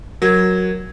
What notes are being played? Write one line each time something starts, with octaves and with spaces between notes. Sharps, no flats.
F#3 A#4 G#6